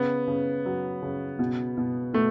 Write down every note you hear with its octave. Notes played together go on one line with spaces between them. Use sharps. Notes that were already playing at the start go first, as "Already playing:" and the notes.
Already playing: C#3 B3
C#3
F#3
C#3
B2
B2
B2 A3